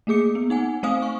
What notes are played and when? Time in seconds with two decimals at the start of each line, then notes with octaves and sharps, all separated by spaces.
0.07 A3 A#3 G#4 D6 C#7
0.35 B3
0.50 D#4 F#5 G#5
0.83 A3 C4 C5 F5 G#5 D#6
1.02 C#6